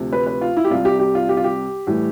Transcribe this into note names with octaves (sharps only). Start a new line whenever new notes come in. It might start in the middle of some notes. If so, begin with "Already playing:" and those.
Already playing: D2 C3 F3
B4
B4
F4
E4
G4
C2 C3 G3 F4
G4
G4
F4
G4
F4
G4
A2 E3 G3